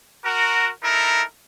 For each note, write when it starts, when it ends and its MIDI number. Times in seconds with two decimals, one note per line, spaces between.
0.24 0.69 66
0.24 0.69 70
0.83 1.22 63
0.83 1.22 64
0.83 1.22 69
0.83 1.22 70